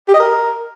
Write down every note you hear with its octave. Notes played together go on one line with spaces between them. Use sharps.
G4
D#5
A#4